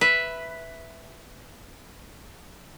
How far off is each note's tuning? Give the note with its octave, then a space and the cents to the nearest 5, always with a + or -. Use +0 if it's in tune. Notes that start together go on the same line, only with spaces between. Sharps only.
B4 +0 E5 +0